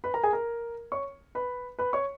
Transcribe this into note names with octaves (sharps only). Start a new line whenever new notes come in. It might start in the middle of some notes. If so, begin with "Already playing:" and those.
B4 B5
A#4 A#5
G#4 G#5
A#4 A#5
C#5 C#6
B4 B5
B4 B5
C#5 C#6